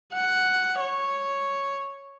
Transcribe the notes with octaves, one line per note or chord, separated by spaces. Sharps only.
F#5
C#5